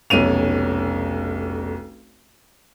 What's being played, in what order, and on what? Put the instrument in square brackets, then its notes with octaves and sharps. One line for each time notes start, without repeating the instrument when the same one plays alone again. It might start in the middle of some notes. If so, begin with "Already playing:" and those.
[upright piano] F1 B1 C#4 D#7 F7